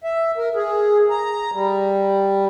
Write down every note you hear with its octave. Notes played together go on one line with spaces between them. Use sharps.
E5
A#4
G#4
A#5
G3